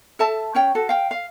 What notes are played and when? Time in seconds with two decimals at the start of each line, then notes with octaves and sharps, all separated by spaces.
0.19 A4 E5 A5
0.55 C#4 C#5 G5
0.75 F#4 A4
0.89 F5 G5
1.11 F5